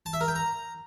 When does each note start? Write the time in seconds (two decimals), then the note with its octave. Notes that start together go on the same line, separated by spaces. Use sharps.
0.06 A5
0.13 E5
0.21 A#4
0.28 G5
0.35 A#5